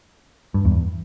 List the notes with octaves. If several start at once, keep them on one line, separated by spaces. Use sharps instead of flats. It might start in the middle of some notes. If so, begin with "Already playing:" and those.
G2
E2